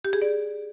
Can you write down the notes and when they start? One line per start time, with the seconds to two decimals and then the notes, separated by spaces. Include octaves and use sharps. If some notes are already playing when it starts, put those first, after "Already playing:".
0.05 G4
0.13 G#4
0.22 D5